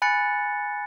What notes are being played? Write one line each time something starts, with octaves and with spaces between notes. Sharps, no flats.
G#5 B5 F#6 A6 C#7